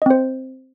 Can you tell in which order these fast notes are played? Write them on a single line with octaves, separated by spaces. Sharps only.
D#5 C4 C5